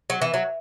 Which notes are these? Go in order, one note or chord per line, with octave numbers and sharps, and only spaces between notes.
F#3
E3
F#3